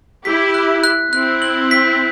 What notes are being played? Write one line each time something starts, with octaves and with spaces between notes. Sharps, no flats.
E4 G4 B6
F#6
F#6
C4 E4 F#6
F#7
B6